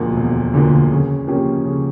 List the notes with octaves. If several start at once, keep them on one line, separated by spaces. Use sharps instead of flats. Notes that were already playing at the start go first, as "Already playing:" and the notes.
Already playing: E1 D2 D3 F3 A#3
E1
D2 D3 F3 A#3
C#3
F3 A#3 C#4 G4
C#3